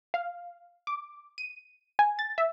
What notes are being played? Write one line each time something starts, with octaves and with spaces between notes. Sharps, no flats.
F5
D6
D#7
G#5
A6
E5